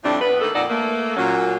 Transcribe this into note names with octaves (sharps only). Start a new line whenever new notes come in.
F2 A2 G3 A3 C4 D4
A2 B3 B4
D#3 A3 A#3 A4
F2 A#2 D#4 A4 D5 F#5
A3 A#3
A#2 F#3 C#4